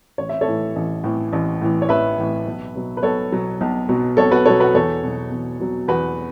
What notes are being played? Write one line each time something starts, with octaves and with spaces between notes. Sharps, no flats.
A1 C#5
E5
A4 C#5
A2 E3
A1
A2 E3
A1
A2 E3
C#5
A1 B4 E5
A2 E3
B1
B2 F#3
B4
B1 A4 C#5
B2 F#3
B1
B2 F#3
B1 A4 C#5
F#4 B4
B2 F#3 A4 C#5
F#4 B4
E2 A4 C#5
B2 F#3
E2
B2 F#3
E2 F#4 B4